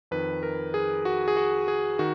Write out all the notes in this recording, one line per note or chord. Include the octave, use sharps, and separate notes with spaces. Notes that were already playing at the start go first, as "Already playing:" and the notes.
F2 D#3 B4
A#4
G#4
F#4
G#4
F#4
G#4
D#3 F#4